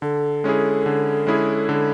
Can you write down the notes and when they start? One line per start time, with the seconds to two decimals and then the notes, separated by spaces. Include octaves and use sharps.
0.02 D3 A4
0.44 G#3 C#4 E4 G#4
0.86 D3
1.27 G#3 C#4 E4 G#4
1.69 D3